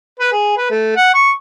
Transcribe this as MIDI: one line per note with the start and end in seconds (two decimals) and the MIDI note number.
0.20 0.31 71
0.32 0.57 68
0.57 0.66 71
0.70 0.95 57
0.96 1.11 78
1.14 1.31 85